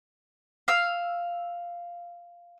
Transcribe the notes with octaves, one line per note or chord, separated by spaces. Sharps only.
F5 E6